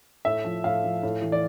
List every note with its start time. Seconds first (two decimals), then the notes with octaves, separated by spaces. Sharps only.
0.25 A2 E5
0.45 F3
0.64 A2 F5
0.84 F3
1.03 A2
1.22 E3
1.32 D5